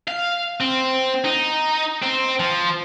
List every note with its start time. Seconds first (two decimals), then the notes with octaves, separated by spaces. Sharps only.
0.08 F5
0.60 C4
1.25 D#4
2.02 C4
2.40 F3